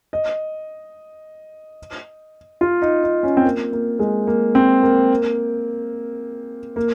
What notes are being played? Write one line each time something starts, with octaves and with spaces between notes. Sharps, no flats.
D#5
F4
D#4
D#4
C#4
C4
A#3
A#3
G#3
A#3
C4
A#3
A#3